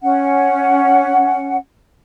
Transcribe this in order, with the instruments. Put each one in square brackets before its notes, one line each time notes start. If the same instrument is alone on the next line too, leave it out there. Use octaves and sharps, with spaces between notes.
[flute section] C#4 F#5